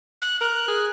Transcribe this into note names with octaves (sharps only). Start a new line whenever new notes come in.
F#6
A#4 F#6
G#4